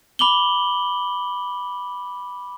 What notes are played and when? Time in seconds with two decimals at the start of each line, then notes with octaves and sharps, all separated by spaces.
0.19 B5 D6 F#7 G7